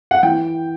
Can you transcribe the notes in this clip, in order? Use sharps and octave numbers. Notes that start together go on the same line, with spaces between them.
F#5
E3 G5